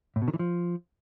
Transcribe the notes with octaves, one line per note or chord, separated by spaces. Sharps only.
A2
B2
D#3
E3
F3